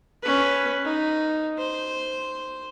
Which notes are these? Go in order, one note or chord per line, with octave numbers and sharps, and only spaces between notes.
C#4 B4
D#4
C5